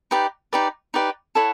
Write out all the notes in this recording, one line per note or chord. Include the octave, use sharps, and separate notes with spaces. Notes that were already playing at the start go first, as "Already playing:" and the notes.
D#4 G4 B4 D5
D#4 G4 B4 D5
D#4 G4 B4 D5
E4 A4 C#5 F#5